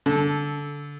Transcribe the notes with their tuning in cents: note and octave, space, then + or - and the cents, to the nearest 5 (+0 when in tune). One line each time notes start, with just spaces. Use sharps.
D3 -20 A4 -10